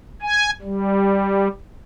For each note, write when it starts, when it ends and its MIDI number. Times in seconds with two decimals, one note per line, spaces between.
0.22 0.50 80
0.62 1.48 55